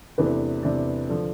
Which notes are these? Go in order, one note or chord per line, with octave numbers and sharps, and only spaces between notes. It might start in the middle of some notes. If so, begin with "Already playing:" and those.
E2 C3 E3 A3 D4 B4
E2 C3 E3 A3 D4 D5
D3 F3 D5